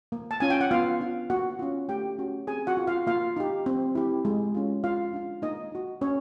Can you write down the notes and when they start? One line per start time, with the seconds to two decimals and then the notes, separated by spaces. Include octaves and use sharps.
0.12 A#3
0.31 A5
0.40 C#4 F4 G#5
0.50 G5
0.61 F#5
0.71 B3 F4 F5
1.00 D4 F4
1.30 A#3 F#4 F#5
1.59 C#4 F4
1.88 A3 G4 G5
2.19 C#4 F#4
2.47 C4 G#4 G#5
2.67 F#4 F#5
2.77 F4
2.87 F4 F5
3.07 A#3 F4 F5
3.36 D#4 G4
3.66 C4
3.95 E4 G4
4.25 G#3
4.55 C#4 F4
4.84 A#3 F4 F5
5.13 D4 F4
5.42 A#3 D#4 D#5
5.72 D#4 F#4
6.01 A#3 C#4 C#5